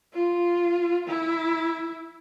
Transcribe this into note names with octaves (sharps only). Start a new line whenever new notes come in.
F4
E4